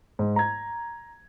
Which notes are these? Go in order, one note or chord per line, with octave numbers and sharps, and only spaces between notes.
G#2
A#5 G#6